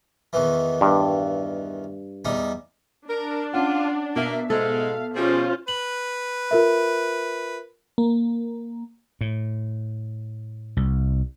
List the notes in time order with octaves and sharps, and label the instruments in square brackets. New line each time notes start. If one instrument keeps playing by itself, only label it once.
[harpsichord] E2 D#3 E3
[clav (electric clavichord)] G2
[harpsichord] E2 G3 D#4
[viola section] D4 [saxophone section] A#4
[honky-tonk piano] C#4 F#5 [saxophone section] F4
[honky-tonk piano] B2 E5 [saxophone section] A#3
[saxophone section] G#2 G#3 [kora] A4 [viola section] F5
[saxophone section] F3 G3 G#4 [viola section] C#4 F4 C5
[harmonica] B4 [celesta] F#7
[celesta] F4 A#4 E5
[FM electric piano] A#3
[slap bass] A2
C2